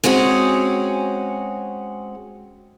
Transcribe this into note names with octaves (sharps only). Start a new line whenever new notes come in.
G#3 C4 C#4 F#4 G#4